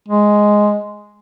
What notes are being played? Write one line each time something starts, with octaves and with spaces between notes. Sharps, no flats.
G#3